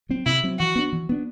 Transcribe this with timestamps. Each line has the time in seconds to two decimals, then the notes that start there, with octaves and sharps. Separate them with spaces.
0.09 F#3 C4
0.26 C3 E4
0.44 F#3 C4
0.59 E3 F#4
0.76 B3 D4
0.92 E3
1.09 B3 D4